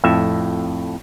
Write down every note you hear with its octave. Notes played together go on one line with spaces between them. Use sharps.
F2 A2 E5